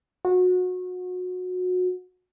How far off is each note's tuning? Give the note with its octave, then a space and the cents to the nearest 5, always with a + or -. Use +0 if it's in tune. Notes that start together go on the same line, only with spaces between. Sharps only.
F#4 -25